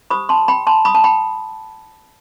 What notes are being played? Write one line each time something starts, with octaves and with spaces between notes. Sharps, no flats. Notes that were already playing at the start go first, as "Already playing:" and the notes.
D#4 G4 C5 B5 D#6
A5 C6
G5 B5
A5 C6
B5 D#6
A5
G5 B5